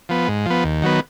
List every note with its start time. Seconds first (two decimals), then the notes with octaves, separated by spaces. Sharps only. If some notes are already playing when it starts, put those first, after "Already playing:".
0.09 F3 B3
0.28 G#2
0.46 F3 B3
0.64 D#2
0.82 D#3 F#3 B3